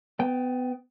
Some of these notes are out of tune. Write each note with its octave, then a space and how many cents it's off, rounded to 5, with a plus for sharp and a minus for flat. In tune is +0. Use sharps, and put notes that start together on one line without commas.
B3 +25 G5 +0